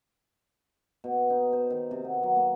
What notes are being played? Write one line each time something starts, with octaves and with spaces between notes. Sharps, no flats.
B2
D#4
C5
D#3
C3
B3
F#3
A#3